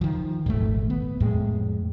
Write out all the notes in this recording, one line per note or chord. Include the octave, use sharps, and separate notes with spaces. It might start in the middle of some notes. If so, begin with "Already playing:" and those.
D#3 F3
D#1 G#1 A3
B3
F2 A2 G#3